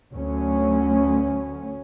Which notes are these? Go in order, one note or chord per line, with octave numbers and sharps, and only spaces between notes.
D2 F#3 C#4